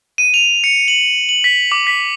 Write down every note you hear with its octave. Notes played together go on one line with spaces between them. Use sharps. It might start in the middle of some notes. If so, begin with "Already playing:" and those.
D#7
F7
C#7
F#7
F#7
B6
D6
B6